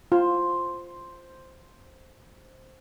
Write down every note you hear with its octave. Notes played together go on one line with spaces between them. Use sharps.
F4 C5